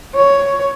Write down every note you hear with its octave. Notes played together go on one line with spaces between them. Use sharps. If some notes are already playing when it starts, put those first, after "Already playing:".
C#5